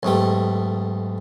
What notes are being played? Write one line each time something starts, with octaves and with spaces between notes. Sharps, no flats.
B1 G#2 A3 G4